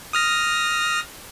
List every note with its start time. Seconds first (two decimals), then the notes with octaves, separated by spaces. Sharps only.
0.13 D#6 F6 A#6